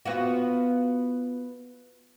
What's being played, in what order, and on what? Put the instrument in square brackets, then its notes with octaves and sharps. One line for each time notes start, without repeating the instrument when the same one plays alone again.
[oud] B3 F4 F#4